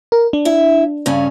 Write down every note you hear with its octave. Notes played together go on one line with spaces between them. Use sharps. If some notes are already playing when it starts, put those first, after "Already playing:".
A#4
D4
E4 E5
G2 C#3 C#4